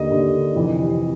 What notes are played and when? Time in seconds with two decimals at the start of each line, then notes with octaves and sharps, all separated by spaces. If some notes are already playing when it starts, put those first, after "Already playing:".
Already playing: D#2 D3 D#5
0.10 D#2 D3
0.56 F2 C3 E3